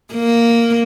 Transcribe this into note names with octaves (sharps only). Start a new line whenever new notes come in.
A#3